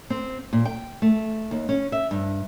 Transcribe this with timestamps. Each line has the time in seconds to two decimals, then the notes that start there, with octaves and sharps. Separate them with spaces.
0.10 C4
0.53 A#2
0.65 G5
1.02 A3
1.51 D#2
1.69 C#4
1.92 E5
2.11 G2